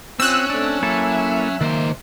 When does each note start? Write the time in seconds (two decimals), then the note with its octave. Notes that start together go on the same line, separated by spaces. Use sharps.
0.20 C4 C#4 F4 E6 F#6
0.50 A3 C4 D4
0.83 F#3 A#3 E4 A4 E5
1.61 C#2 D#3 A#3 C5